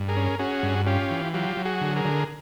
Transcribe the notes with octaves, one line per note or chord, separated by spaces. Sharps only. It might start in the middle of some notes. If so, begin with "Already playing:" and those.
Already playing: G2
G#4 A#4
C#4
C#4 F#4 G#4
G2
C#4 F4 G4
E3
F#3 F4 G4
F#3
F#4 G#4
D3
G#4 A#4
D3